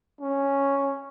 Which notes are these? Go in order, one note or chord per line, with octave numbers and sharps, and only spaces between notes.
C#4